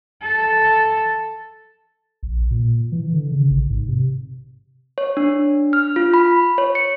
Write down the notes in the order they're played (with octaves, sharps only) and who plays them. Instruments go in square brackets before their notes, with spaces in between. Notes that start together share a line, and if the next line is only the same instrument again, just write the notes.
[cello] A4
[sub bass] A#1
A#2
E3
D3
C#3
A1
G#2
C3
[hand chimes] C#5
D4
F6
F4
B5
C#5
C#7